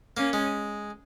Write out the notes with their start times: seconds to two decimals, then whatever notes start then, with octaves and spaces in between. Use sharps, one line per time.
0.17 A#3 C#4
0.33 G#3